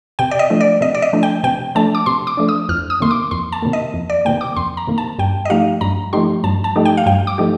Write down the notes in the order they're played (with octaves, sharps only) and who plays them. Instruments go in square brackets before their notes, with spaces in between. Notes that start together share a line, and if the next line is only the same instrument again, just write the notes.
[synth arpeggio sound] C3 [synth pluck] G5
[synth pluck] D5
D#5
[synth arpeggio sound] F3 A3 D4
[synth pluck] D5
[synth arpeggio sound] C3 [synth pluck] D#5
[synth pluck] D5
D#5
[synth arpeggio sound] F3 A3 D4
[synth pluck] G5
[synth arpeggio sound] C3 [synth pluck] G5
[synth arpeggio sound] F3 A3 D4 [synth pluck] A5
[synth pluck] D6
[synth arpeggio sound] C3 [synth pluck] C6
[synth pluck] D6
[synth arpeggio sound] F3 A3 D4
[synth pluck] D#6
[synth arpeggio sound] F2 [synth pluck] F6
[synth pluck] D#6
[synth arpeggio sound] C3 D#3 A#3 [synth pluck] C6
[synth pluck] D6
[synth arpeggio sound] F2 [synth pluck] C6
[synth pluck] A5
[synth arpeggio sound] C3 D#3 A#3
[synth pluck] D#5
[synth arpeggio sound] F2
[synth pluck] D5
[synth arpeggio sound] C3 D#3 A#3 [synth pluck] G5
[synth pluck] D6
[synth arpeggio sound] F2 [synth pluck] C6
[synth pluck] A#5
[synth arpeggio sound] C3 D#3 A#3
[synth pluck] A5
[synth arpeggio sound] G2 [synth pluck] G5
[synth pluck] D#5
[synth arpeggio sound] F3 A3 D#4 G4 [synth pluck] F5
[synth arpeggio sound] G2 [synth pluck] A#5
[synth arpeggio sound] F3 A3 D#4 G4 [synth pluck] C6
[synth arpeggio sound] G2 [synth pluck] A5
[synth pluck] A5
[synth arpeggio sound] F3 A3 D#4 G4
[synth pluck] G5
F5
[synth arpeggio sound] G2 [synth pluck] G5
[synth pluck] D6
[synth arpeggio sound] F3 A3 D#4 G4